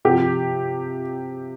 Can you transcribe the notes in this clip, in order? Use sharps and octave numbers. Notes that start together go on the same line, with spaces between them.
C3 F3 G4